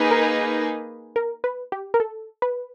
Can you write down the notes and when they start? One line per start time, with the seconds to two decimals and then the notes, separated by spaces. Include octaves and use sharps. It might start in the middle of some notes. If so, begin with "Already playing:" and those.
Already playing: A#3 D#4 G#4 B4
0.11 A#4
1.16 A#4
1.44 B4
1.72 G4
1.94 A#4
2.00 A4
2.42 B4